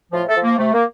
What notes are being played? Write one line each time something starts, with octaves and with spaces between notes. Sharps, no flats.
A2 F3 F4
A3 A4
F3
A#3
C3 A3
A#3